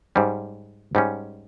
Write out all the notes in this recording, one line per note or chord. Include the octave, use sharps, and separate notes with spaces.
G#2 G3 C#4
G#2 G3 C#4